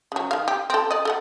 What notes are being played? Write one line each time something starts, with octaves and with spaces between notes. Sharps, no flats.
C#3 F#3
D#3 F5
G4
C4 A4
D5 D#5
A4 D5 F#5